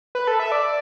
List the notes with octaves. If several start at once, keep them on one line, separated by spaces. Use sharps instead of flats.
B4
A4
E5
D5